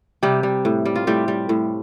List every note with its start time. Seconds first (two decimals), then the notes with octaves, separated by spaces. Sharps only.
0.23 C3 G3 G4
0.43 G3
0.65 A2
0.85 G3
0.96 F4
1.07 A2 G3 G4
1.28 G3
1.49 A2